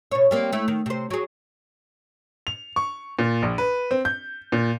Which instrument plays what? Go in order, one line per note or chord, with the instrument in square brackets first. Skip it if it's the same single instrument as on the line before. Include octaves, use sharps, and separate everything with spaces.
[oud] B2 C#5
G3 A#3 C4
A3 E4
D#3
C3 C5
F#3 G#4
[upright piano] F7
C#6
A#2
A#1
B4
C4
G6
A#2